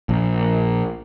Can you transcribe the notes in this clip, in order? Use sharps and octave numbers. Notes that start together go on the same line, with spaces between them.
A#1